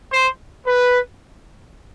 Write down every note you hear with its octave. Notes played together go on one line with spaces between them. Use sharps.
C5
B4